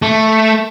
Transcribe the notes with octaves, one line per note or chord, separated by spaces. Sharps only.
A3